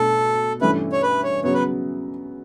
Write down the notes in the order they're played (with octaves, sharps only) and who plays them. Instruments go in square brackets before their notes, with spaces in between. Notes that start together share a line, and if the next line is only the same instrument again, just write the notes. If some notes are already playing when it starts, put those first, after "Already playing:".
Already playing: [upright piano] B2 A3 D4 [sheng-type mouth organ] A4
[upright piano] G2 E3 A3 C#4 E4 [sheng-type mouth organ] B4
[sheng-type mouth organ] C#5
B4
C#5
[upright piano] C#3 F#3 B3 [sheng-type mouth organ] C#5
[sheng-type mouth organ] B4